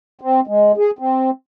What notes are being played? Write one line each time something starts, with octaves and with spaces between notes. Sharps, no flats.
C4
G#3
G#4
C4